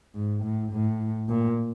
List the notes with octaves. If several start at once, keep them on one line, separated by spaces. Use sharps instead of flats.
G#2
A2
A2
A#2